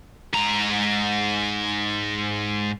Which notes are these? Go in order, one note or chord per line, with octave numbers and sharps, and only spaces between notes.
G#2 A#5